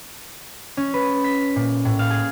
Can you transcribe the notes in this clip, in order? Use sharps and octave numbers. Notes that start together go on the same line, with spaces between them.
C#4
B4
B6
A#2
A2
F5
G#4